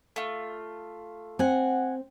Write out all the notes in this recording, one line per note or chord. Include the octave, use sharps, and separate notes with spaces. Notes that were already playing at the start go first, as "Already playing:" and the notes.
A3 F4
C4 F#5 G#5